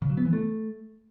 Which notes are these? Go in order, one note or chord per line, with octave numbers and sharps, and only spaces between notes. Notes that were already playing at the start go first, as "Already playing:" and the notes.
C#3
F#3
B3
E3
A3